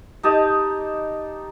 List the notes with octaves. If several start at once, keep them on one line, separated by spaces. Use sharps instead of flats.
D#4 G4 A5 D#6